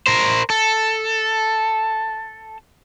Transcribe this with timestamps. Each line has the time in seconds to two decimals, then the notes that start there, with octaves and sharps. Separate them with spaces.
0.07 A#4 C5
0.50 A4